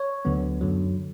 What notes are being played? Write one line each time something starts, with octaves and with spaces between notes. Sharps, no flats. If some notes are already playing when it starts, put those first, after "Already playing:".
Already playing: C#5
D2 D3 F#3 B3
F#2 D3 F#3